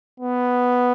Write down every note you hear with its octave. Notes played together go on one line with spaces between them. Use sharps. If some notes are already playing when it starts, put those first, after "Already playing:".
B3